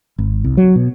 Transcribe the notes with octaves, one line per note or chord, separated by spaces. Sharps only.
G#1
C2
F#3
B2